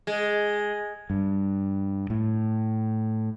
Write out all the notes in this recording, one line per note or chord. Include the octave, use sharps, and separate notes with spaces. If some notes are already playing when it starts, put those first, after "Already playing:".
G#3
G2
A2